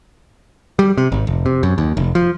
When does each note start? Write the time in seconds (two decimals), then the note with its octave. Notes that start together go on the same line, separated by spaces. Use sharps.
0.79 G3
0.98 C3
1.12 G#1
1.27 F1
1.46 C3
1.63 F#2
1.78 D#2
1.97 F1
2.15 F3